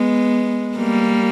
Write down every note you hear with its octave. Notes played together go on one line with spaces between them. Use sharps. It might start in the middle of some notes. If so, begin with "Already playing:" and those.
Already playing: G#3 B3
G3 A#3